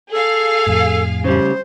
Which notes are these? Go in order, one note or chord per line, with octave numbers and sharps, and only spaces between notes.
G#4 A4 F5
F2 A2
C#3 G3 C5